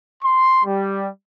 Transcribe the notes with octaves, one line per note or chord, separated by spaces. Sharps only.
C6
G3